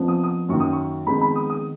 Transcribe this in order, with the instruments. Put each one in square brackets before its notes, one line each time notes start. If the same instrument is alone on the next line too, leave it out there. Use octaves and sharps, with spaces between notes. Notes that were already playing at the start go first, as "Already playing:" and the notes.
Already playing: [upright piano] F2 F3 B3
D#6
D#6
F#2 D#3 A#3 C#6
D#6
C#6
F2 D#3 G#3 B3 D#4 B5
B5
D#6
D#6